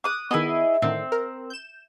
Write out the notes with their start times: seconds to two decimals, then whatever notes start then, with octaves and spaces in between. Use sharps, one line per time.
0.04 D6 D#6 F#6
0.31 D#3 B3 E4 G#4 D#5
0.82 A2 D3 D#3 C4
1.12 A#4
1.50 G6 E7